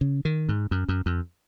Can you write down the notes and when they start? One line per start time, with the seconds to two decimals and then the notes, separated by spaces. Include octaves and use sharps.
0.01 C#3
0.25 D#3
0.49 G#2
0.71 F#2
0.89 F#2
1.06 F2